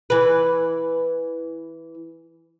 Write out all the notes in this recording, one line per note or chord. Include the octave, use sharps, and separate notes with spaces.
E3 B4